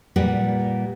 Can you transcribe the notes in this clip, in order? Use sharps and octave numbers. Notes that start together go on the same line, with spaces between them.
A#2 G3 G4 B4 F#5